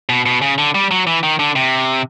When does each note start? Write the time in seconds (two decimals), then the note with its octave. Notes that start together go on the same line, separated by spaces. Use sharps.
0.09 B2
0.26 B2
0.42 C#3
0.58 D3
0.75 G3
0.91 F#3
1.07 E3
1.23 D#3
1.39 D3
1.56 C3